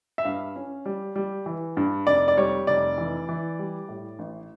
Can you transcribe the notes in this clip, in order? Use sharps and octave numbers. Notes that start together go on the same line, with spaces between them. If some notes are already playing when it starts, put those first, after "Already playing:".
E5
G2 F5
C#4
G3
G3
E3
G2
F1 D5
D5
G3 C#5
F1 D5
E3
E3
G3
A2
A1